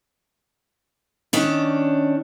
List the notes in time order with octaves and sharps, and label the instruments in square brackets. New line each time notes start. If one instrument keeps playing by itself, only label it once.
[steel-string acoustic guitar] D#3 C#4 D4